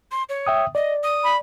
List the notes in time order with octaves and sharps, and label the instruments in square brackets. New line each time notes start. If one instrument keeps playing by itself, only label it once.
[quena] C6
C#5
[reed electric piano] E5 G5 D#6
[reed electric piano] D5 [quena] D#5
[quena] D#6
[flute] B5